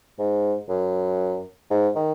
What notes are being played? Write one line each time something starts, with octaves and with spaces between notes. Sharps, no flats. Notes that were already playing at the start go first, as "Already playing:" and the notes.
G#2
F#2
G#2
D#3